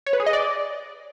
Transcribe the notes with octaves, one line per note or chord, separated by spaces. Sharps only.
C#5
B4
G#4
D#5
D5